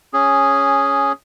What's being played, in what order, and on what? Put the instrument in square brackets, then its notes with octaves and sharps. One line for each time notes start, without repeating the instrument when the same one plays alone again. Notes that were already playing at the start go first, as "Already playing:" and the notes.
[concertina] C#4 G#4